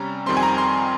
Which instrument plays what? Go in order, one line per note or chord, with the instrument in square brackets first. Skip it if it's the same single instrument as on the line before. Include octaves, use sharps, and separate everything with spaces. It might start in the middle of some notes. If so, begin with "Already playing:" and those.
Already playing: [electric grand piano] C3 G3 C#4 A#5
F2 D#3 G3 C4 C6
G#5
A#5
C6